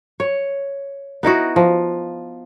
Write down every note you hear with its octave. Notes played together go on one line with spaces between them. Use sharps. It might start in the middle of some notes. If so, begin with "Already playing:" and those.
C#5
B3 D#4 E4 F#4
F3